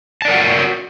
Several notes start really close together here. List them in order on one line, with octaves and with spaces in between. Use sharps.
A5 D5 A#4 F#5 F#4